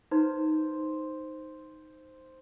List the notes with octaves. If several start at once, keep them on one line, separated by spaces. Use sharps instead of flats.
D#4 B4 C5